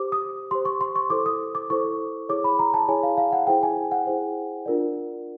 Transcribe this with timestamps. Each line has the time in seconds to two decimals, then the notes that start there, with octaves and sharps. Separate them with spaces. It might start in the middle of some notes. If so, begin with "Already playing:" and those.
Already playing: G4 C5 D6
0.12 D#6
0.51 G4 C5 C6
0.65 C#6
0.81 C6
0.96 C#6
1.10 E4 A4 C5 D6
1.26 D#6
1.55 D6
1.70 E4 A4 C5 C#6
2.29 E4 G#4 C#5 D6
2.44 B5
2.59 A#5
2.74 A5
2.88 E4 G#4 C#5 G#5
3.03 F5
3.17 F5
3.33 F#5
3.47 E4 G#4 C5 G5
3.63 G#5
3.92 F#5
4.07 E4 G#4 C5
4.66 D4 F4 A#4 D5